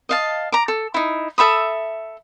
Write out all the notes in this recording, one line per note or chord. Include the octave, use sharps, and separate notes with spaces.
D#5 F5 A5
A#5 D6
A4
D#4 E4
A4 E5 B5 D#6